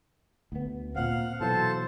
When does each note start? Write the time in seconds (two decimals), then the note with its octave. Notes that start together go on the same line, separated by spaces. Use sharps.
0.52 D2 B3
0.96 A#2 C4 F5 F#5
1.40 B2 E3 F#3 A4 C5 A5